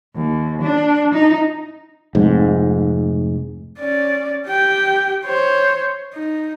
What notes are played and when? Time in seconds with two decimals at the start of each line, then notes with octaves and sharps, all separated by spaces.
0.14 D#2
0.61 D4
1.14 D#4
2.15 F1 G#2
3.80 C#4 D5
4.47 G4 G5
5.25 C5 C#5
6.14 D#4